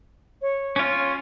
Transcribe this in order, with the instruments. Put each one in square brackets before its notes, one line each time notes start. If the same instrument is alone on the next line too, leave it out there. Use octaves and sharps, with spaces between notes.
[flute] C#5
[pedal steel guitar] C#4 F4